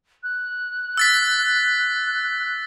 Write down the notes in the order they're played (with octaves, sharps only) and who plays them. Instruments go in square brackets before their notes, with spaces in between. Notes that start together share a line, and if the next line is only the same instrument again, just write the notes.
[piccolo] F#6
[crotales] E6 A6 B6